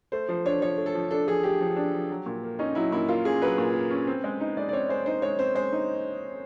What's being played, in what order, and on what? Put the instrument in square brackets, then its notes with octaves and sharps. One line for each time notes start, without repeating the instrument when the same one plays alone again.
[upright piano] A3 [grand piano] C5
[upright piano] F3 [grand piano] C5
[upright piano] D4 [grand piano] C#5
[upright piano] F3 [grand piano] C#5
[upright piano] A3
[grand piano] A4
[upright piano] F3
[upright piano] D4 [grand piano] A4
[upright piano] F3 [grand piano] G#4
[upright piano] A3 [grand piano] G4
[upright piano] F3
D4
F3
F#3
A#2
A#3
[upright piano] C#4 [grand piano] D#4
[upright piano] F#3 [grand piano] E4
[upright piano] A#2 [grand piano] E4
[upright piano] A#3 [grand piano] F4
[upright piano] C#4 [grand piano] G#4
[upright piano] F#3 [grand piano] B4
[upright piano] A#2
A#3
C#4
C4
G#3
D#4
[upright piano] G#3 [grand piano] D5
[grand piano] D5
[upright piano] C4 [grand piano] C#5
[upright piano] G#3 [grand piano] C5
[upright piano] D#4 [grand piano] C5
[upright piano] G#3 [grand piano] C#5
[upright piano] C4 [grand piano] C5
[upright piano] G#3 [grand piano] C5
[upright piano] D#4